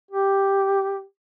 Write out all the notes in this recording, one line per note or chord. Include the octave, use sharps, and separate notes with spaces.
G4